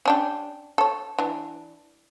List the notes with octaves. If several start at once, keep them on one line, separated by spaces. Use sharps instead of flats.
C#4 D4 G4
A4 C#5
E3 D4